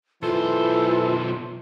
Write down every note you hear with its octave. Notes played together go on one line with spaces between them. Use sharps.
B1 E3 F4 A4 C5